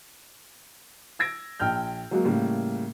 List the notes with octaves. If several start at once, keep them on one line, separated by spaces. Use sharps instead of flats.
E6 G#6 A#6 D7
A#1 G5 F6 G6
F#3 G#3 A#3 F#4
A2 C#3 G3 A#3